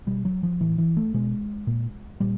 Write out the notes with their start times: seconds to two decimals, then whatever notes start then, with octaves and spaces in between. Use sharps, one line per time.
0.07 B2 G3
0.25 F#3
0.43 F3
0.60 A2 E3
0.78 E3
0.97 A3
1.14 B2 G#3
1.67 A#2
2.20 A#2 G3